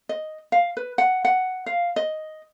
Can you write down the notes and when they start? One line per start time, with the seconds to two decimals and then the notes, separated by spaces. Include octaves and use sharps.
0.09 D#5
0.52 F5
0.77 B4
0.98 F#5
1.25 F#5
1.66 F5
1.96 D#5